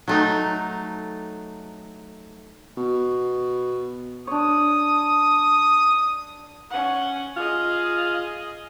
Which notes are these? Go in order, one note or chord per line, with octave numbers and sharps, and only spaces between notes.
F#3 A3 D#4
B2
D4 C#5 D#6
C#4 F#5
F4 G#4 D#5